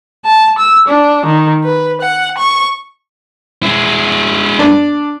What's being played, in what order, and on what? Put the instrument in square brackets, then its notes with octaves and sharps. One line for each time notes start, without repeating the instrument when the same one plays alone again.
[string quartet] A5
E6
D4
D#3
B4
F#5
C#6
[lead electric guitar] G#3 E4
[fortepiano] D4